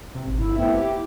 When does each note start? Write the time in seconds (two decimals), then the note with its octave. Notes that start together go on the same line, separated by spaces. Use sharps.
0.15 C3
0.27 G#1
0.39 G1 F2 E4
0.56 A3 B3 C4 E4
0.73 G4